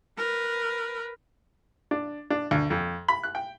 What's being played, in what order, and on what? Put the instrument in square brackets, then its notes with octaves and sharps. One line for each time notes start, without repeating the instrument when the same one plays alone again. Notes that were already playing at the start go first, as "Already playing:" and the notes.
[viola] A#4 B4
[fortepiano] D4
D4
D2
F2
B5
F#6
G5